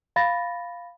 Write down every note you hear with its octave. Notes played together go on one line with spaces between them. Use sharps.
F5 B5 A6 A#6